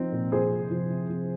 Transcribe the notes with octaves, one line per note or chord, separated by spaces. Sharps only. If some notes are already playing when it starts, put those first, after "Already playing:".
Already playing: F3 C4 D#4
A#2
F3 G#4 C5
C3
F3
C3
F3